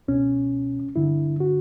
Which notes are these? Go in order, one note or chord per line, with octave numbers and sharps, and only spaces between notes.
C#2 B2 C#4
G2 D3 E4
F#4